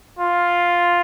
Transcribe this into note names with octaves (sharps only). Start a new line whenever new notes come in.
F4